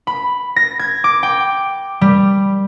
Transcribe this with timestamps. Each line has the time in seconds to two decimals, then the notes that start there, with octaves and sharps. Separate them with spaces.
0.07 B5
0.56 A#6
0.79 G#6
1.04 D6
1.23 G5
2.01 G3